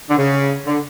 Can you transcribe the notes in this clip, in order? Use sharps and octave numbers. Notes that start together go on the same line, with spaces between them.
D3
C#3
D3